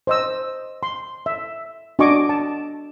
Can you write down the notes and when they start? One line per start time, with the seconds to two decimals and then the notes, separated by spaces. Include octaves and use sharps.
0.07 C5 D#5 E6
0.83 C6
1.26 E5
1.99 D4 F#4 D#5 G#5 C#6 D6
2.29 A5